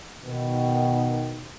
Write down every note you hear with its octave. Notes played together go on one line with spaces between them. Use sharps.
B2 D#3